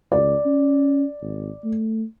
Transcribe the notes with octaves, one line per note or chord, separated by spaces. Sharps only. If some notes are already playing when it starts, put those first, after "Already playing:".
C#2 D5
C#4
G#1
A3